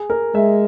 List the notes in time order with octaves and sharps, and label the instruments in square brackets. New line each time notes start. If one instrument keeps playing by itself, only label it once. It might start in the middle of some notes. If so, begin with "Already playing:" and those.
Already playing: [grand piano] G#4
A#4
[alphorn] G#3 [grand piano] E5